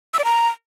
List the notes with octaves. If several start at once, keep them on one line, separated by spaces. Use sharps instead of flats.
E6
D5
A#5